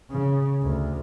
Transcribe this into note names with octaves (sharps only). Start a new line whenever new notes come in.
C#3
D2